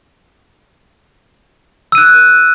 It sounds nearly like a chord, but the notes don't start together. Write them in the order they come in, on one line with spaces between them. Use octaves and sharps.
E6 D#7 F#6